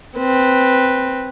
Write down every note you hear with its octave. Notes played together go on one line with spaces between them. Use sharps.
C4 B4